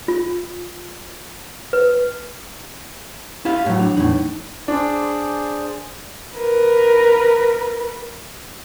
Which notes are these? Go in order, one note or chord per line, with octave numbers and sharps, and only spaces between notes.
F4
B4
E4 G4 F5
A2 F#3
D4
E2 A2 D#4
D4 G#4 C5 D5
A#4 B4